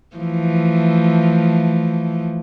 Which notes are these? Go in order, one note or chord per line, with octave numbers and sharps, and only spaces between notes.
E3 F3 A3